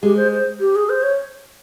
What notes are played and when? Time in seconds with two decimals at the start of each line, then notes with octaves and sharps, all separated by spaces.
0.03 G#3 G4
0.17 C5
0.32 C5
0.60 G4
0.75 G#4
0.89 C5
1.03 C#5